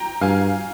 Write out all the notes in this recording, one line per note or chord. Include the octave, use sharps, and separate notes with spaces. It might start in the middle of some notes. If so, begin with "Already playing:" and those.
Already playing: G5 A#5
G2 F5 G#5